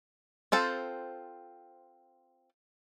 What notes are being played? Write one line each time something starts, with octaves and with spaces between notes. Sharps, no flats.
C4 F4 A4 C5